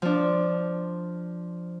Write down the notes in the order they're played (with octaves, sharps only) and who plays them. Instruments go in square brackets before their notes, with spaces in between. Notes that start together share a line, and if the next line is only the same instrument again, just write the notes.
[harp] F3 D4